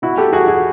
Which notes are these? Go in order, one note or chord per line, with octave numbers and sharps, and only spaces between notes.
B2 E4 F#4
G4 A4
E2 F#4 G#4
F#4 G#4